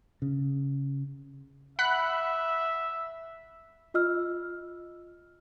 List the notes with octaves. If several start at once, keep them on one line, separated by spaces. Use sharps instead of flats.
C#3
E5 F#5 B5 F#6
F4 D#5 E6 F6